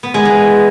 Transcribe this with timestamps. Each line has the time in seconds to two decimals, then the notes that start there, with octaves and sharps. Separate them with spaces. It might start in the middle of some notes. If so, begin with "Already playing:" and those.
0.03 B3
0.14 G#3
0.25 E3